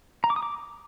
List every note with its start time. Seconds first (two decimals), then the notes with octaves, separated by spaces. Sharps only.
0.24 A#5
0.30 D6
0.36 D#6
0.43 D6